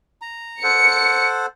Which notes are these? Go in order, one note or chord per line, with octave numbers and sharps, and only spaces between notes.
A#5
A4 C5 F#5 C#7